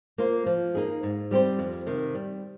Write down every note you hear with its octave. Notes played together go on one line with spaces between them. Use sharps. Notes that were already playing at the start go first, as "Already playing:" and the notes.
A#3 F4 C5
F3
A#3 D#4 G#4
G#2
G3 C4 G4 C5
F2
C3 D#3
G3